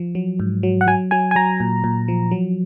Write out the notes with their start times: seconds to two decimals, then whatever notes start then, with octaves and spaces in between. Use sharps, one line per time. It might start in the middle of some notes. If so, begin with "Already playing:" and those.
Already playing: F3
0.15 F#3
0.40 G#2
0.63 F#3
0.81 F#5
0.87 F#3 G#5
1.11 F#3 G#5
1.31 G#5
1.36 F#3 A#5
1.60 A#2
1.84 A#2
2.08 F3
2.31 F#3